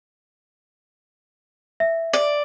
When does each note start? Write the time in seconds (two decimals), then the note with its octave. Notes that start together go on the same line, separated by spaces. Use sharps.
1.80 E5
2.14 D5